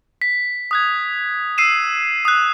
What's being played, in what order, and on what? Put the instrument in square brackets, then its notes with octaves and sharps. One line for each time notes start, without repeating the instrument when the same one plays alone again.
[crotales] B6
D#6 F#6 G#6
E6 C7 D#7 E7
D#6 F#6